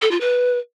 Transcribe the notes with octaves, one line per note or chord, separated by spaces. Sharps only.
A4
F4
B4